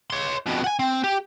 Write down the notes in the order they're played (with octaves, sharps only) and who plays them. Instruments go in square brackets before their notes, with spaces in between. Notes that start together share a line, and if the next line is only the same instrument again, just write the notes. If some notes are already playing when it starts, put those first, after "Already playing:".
[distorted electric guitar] C#5 C6
F2 B2
F#5 G#5
C4
G4